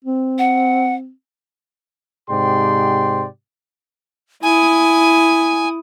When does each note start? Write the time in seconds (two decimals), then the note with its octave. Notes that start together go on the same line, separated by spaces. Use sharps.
0.05 C4
0.39 F#5
2.30 G#2 C3 G4 D5 G5 C6
4.43 E4 G#5 D#6